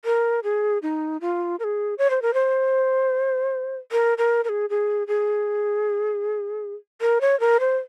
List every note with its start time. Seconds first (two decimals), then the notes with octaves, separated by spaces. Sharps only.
0.05 A#4
0.43 G#4
0.82 D#4
1.21 F4
1.59 A#4
1.64 G#4
1.98 C#5
2.10 C5
2.22 A#4
2.34 C5
3.92 A#4
4.18 A#4
4.44 A#4
4.49 G#4
4.70 G#4
5.07 G#4
7.01 A#4
7.21 C#5
7.40 A#4
7.60 C5